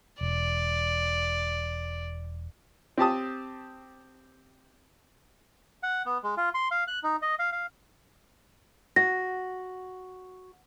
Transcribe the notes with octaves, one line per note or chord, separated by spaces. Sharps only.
E1 D5
C4 G4 A5 D#6
F#5
B3
G#3
F4
C6
F5
F#6
D#4
D#5
F5
F5
F#4 A#6